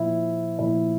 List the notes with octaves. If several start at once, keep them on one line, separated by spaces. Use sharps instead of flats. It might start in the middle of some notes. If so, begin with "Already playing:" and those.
Already playing: A#2 F3 E4
A#2 F3 E4